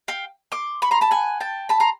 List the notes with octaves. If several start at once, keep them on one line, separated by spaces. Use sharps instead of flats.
F5 G5
C6 D6
B5 C#6
A#5 C6
A5 B5
F#5 G#5
G5 A5
A5 B5
A#5 C6